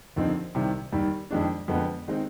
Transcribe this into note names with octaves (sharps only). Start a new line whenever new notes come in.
D#2 D3 F3 C4 D#4
C2 C3 D#3
D#2 D#3 G3
F2 D#3 G#3 D4
F2 D3 G#3 B3
D#3 G#3 C4 D#4